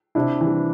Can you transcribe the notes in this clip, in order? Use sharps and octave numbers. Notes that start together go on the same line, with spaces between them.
C3 D4 E4
E3 G3